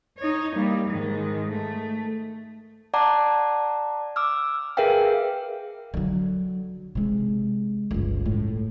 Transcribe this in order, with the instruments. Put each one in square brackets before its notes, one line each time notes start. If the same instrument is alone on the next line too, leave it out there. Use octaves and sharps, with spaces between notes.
[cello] D#4 C#5
G3 A#3
G#2 D#3
A3
[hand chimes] D5 F#5 A5 A#5 D6
D6 E6 F6
G#4 A#4 B4 E5 F5 G5
[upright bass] D3 F#3
C3 G#3
G1 C#2
A2